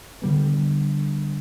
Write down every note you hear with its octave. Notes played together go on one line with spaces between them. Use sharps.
D3 G3 B3